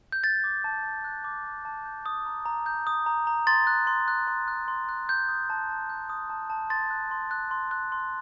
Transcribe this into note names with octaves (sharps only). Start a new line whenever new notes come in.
G6
F#6 A6
D6
A5
A5
F#6
D6
A5
A5
G6
D#6
A#5
A#5
G6
D#6
A#5
A#5
C6 A6
F#6
C6
F#6
C6
F#6
C6
F#6
G6
D#6
A5
A5
G6
D#6
A5
A5
C6 A6
F#6
C6
F#6
C6
F#6
C6